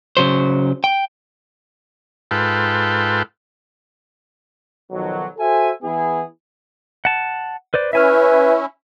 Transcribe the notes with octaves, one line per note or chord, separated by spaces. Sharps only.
C#3 F#3 C5
G5
G#2 F4 A4 B4 G5
B1 D#3 F3 F#3
F#4 A4 C5 E5 G#5
E3 B3 E4 G#4
F#5 A5
B4 C5 D5
C#4 E4 B4 E5 G#5 F6